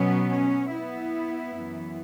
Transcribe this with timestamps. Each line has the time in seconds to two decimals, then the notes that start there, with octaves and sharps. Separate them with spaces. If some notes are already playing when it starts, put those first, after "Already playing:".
Already playing: B2 F#3 B3 C#4
0.29 C#4
0.71 B3 E4
1.55 F#2 E3 B3